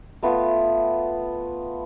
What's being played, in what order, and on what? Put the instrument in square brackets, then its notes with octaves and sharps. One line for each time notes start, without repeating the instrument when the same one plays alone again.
[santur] A3 B3 F4